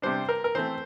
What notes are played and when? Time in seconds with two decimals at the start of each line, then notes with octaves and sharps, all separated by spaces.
0.02 C3 G3 D4 C5
0.29 A#4
0.44 A#4
0.55 E3 A3 C4 C5